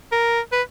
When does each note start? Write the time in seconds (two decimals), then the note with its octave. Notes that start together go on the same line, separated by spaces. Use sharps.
0.12 A#4
0.52 B4